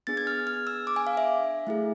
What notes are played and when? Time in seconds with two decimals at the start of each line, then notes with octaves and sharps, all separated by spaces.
0.07 B3 D4 G#4 A6
0.17 G#6
0.27 F6
0.47 F6
0.67 E6
0.87 D6
0.96 G#5
1.07 F5
1.17 E5
1.67 A3 E4 G#4